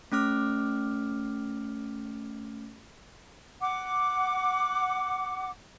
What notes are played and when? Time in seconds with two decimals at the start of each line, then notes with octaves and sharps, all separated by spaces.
0.12 A3 C#4 D6 F6
3.61 F#5 D6